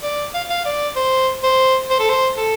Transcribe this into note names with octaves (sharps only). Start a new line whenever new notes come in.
D5
F5
F5
D5
C5
C5
C5
A4
C5
A4